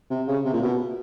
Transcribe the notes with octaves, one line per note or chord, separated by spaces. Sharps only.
C3
C#3
C3
A#2
B2